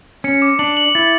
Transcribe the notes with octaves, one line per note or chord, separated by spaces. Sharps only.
C#4 C#7
D6
D4 F#7
F#7
E4 A6